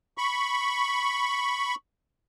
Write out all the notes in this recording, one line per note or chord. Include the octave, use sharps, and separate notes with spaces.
B5 C#6